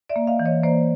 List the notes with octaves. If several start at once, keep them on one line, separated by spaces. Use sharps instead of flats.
D5 E5
A#3
D#5 F5
E3
C#5 D#5
A#3 C5 D5